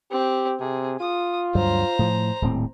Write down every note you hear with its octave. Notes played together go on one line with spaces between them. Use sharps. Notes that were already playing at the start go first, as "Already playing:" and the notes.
C4 G4
C3 G#4
F4 D#6
D2 G2 F#3 C5 A#5
A2 F3
D#1 A2 C4